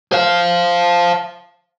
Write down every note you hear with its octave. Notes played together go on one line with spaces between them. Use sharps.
C5 F5